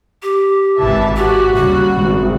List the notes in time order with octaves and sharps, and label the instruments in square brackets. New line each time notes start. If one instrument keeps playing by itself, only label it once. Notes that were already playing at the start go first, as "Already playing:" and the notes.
[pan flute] G4
[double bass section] G#1 [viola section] E3 E5 A5
[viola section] F#4 F#5 [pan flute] G4
[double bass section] D#2 C#3 [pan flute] G3
[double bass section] G#1